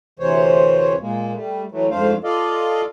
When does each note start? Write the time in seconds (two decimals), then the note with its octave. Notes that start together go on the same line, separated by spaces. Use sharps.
0.19 D2 C3 E3 C5 C#5
1.00 A#2 G#3 A#3
1.33 G3 A3
1.71 E3 F#3 A3
1.91 F2 G#2 A3 D4 C5 F5
2.24 F4 A4 D5 D#5 F5